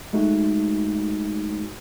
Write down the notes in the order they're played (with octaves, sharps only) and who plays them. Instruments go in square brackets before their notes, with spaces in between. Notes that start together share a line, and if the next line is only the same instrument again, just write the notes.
[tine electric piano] G#3 A3 D#4 F#4